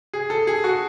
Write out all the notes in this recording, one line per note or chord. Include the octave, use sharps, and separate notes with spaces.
G#4
A4
G#4
F#4